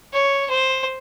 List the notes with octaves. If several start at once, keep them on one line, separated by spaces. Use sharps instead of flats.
C#5
C5